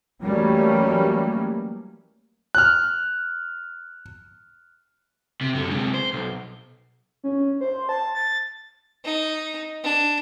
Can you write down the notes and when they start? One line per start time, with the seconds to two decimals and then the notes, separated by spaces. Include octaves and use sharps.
0.22 E3 F#3 G3 A3 A#3 C#4
2.55 F6 F#6
5.41 C3
5.54 F#2 D3
5.70 C3 G#3
5.94 C5
6.13 B1
7.24 C#4
7.61 C5
7.89 A5
8.15 A6
9.05 D#4
9.84 D4